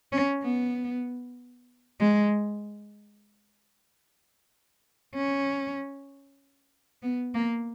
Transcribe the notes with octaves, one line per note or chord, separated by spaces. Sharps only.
C#4
B3
G#3
C#4
B3
A#3